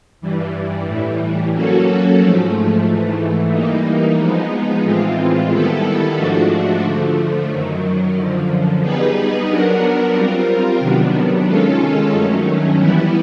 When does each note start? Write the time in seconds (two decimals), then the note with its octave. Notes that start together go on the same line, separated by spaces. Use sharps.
0.21 G2 E3 G3
0.87 A2 E3 G3
1.53 F#3 A#3 C#4 F#4 A4
2.20 G#2 F3 A3
2.86 G#2 E3 A3
3.52 E3 G3 A#3 D#4
4.18 F3 G#3 B3 D#4
4.84 A2 E3 G#3 C4 F4
5.51 D#3 G3 B3 E4 A4
6.16 G#2 F3 A3 D4 F#4
6.83 D3 F3 A3
7.49 F#2 D#3 F#3
8.15 F#2 D3 F3
8.81 G3 B3 D#4 G#4 B4
9.47 F#3 B3 D4 F#4 A#4
10.14 G3 C4 F4 A#4
10.79 C3 D#3 F#3 B3 D4
11.46 D#3 G#3 C#4 F4 A4
12.13 G2 D#3 F#3 A3 C#4
12.78 E3 G3 B3 E4